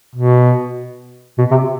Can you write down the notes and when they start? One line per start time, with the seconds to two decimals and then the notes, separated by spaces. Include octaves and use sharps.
0.16 B2
1.38 B2
1.51 C3